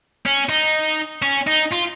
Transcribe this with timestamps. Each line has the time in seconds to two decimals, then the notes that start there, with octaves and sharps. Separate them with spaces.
0.26 C#4
0.49 D#4
1.22 C#4
1.47 D#4
1.72 F4